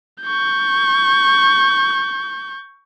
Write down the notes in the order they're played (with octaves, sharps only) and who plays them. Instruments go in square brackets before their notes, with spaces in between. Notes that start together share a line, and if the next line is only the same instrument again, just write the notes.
[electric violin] C#6 G6